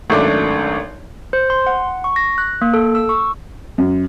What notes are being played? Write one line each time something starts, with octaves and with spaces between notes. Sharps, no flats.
G#1 F#2 A3 D4 D6
C5
C6
F#5
C#6
A#6
F#6
A#3
A4
E6
C#6
F#2